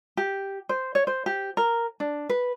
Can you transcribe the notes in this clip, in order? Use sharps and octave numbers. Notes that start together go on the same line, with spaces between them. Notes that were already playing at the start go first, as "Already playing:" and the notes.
G4
C5
C#5
C5
G4
A#4
D4
B4